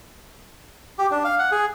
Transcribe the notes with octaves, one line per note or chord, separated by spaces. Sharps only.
G4
D4
F5
F#5
G#4